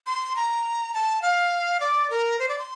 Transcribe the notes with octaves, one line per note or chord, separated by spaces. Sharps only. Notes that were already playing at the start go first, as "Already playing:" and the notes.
C6
A#5
A5
F5
D5
A#4
C5
D5
C6